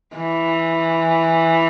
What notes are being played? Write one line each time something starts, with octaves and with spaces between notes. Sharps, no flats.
E3